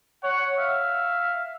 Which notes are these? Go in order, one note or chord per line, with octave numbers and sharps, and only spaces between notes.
C#5 F#5
E5 F5